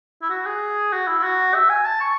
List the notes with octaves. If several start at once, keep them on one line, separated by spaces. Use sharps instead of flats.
E4
F#4
G#4
F#4
E4
E4
F#4
E5
G#5
A5
C#6